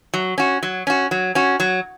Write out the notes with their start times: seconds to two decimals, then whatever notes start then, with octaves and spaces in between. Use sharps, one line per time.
0.14 F#3
0.38 C#4 F#4
0.63 F#3
0.87 C#4 F#4
1.11 F#3
1.35 C#4 F#4
1.60 F#3